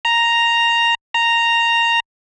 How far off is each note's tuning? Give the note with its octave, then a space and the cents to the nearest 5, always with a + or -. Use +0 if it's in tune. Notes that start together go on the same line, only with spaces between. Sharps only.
A#5 +0
A#5 -5